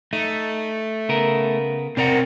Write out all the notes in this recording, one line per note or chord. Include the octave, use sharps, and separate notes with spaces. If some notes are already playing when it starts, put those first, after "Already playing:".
A3 D#4
C#3 B3 A#4
C3 C4 A#4 D5 F#5 A#5